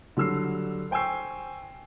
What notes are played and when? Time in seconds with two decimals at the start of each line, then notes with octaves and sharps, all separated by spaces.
0.17 D3 F#3 G3 E6 F6 C7
0.91 C5 G5 G#5 C#6 E6 C7